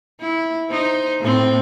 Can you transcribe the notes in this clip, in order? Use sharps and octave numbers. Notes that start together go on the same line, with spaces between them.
E4
D#4 C5
A2 C4